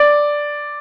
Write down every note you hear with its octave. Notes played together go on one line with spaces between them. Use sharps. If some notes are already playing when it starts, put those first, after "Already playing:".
Already playing: D5